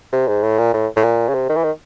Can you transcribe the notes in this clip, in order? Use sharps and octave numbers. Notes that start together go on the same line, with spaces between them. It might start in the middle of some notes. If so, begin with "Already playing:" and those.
C3
G#2
A2
A#2
A2
A2
A#2
C#3
C3
D#3
E3
D#3